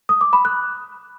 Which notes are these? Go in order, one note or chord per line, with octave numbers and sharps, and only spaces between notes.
D#6
D6
B5
F#6